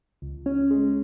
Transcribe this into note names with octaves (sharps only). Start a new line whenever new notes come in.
C#2
C#4
G#3